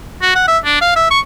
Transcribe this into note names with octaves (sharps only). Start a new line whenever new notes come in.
F#4
F#5
E5
D4
F5
E5
C#6